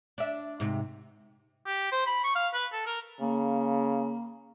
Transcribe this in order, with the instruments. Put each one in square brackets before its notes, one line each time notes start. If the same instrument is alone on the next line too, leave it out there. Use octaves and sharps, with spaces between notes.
[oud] D4 E5
G#2 C3
[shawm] G4
C5
B5
C#6
F5
B4
A4
A#4
[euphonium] C#3 [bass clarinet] A#3